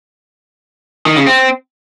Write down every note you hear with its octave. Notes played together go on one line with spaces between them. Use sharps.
D#3
C#3
C4